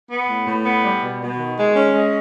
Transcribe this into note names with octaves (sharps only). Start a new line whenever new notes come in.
B3
A2
A2
B3
G3
B2
B2
D#3
G#3
C#4
G#3